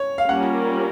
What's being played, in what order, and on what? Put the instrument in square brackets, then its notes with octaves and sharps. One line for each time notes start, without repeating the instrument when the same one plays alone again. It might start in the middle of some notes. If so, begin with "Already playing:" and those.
Already playing: [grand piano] C#5
F5
[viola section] G3 A#3 C#4 F4 A#4 [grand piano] F#5